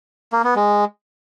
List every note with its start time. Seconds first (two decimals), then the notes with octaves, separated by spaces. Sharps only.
0.33 A#3
0.44 B3
0.56 G#3